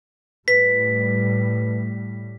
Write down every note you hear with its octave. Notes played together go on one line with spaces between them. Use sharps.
A2 G3 B4 B6